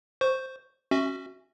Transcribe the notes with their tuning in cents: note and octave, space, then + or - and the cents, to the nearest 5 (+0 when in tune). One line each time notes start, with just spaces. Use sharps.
C5 +0 C#6 +0
C#4 -20 F#4 +0 E5 +0